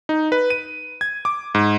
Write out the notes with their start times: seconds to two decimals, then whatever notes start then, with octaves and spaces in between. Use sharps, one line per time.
0.09 D#4
0.32 B4
0.50 D#7
1.01 G#6
1.25 D6
1.55 G#2